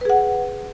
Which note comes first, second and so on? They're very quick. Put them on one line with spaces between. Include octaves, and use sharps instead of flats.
B4 G#4 F#5